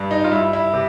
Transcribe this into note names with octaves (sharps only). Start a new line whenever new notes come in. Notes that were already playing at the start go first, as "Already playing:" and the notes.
Already playing: G2
D#4
F4
G2 E4
E4
C3